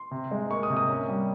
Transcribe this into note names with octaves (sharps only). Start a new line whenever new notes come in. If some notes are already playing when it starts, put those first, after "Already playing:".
Already playing: C6
C3
G#3
A#3 C#6
D#6
C3
D#6
C#4
G3